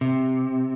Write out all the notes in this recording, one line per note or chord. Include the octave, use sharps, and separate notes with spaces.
C3